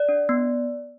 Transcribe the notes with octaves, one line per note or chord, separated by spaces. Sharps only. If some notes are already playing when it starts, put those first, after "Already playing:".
Already playing: D5
D4
B3